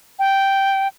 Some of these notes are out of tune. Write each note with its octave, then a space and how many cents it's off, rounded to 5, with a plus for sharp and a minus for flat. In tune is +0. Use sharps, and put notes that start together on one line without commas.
G5 -5